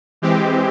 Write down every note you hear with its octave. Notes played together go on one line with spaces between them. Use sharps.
E3 G#3 C4 G4